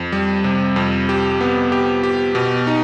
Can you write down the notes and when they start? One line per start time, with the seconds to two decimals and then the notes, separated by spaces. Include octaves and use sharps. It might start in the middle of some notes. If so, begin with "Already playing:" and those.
Already playing: F2
0.12 G3
0.44 C3
0.76 F2
1.09 G4
1.41 B3
1.72 G4
2.03 G4
2.35 B2
2.67 D#4